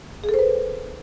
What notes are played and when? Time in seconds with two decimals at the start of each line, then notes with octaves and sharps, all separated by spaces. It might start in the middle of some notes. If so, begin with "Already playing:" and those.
0.24 G#4
0.29 A4
0.34 C5
0.39 B4